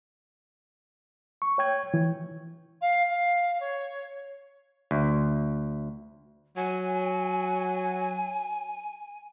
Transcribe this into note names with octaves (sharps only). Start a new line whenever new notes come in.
C#6
C#5 G5 G#6
E3
F5
F5
C#5
D2
F#3 G#5